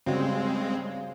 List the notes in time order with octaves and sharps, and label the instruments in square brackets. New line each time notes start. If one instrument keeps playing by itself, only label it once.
[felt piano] G2 C#3 F#4 [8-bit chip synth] G#3 C4